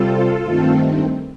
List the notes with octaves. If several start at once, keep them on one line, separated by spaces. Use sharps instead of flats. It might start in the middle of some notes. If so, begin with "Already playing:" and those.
Already playing: C3 G3 C4 F4 A4
G2 D#3 A3 C4